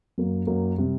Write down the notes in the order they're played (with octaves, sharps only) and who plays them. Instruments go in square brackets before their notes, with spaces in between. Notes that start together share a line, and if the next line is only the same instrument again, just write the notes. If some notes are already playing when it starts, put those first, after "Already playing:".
[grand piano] F#2 F#3 A#3
F#2 F#3 A#3
C3 G3